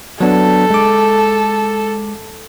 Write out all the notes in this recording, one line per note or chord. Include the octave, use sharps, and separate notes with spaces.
F#3 B3 D4 A4
G#3 D6